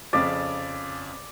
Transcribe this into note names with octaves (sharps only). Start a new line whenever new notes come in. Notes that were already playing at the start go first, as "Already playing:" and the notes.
F2 C#3 D5